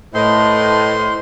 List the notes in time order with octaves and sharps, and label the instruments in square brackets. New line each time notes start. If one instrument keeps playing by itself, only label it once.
[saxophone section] A2 [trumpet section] B4 D#5 [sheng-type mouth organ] C5 C6